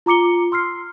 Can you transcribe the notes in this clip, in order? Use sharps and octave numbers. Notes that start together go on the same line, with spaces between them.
F4 A#5 D6 C#7 G7
C6 E6 F6 C7